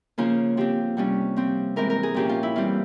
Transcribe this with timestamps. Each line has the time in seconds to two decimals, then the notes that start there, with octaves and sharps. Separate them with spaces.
0.18 C#3 F3 A#3 F4
0.57 F3 C4 G4
0.97 C3 G3 C#4
1.36 F3 C4
1.76 E3 G#3 C4 A#4
1.90 A#4
2.03 G#4
2.14 A#2 F3 A#3 C#4 G4
2.29 F4
2.43 E4
2.55 E3 G3 C4 F4